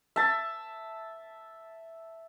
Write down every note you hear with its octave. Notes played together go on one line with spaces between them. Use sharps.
E5 A5